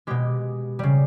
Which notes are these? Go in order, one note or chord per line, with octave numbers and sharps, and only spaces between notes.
B2 G#3 G4
C#3 G3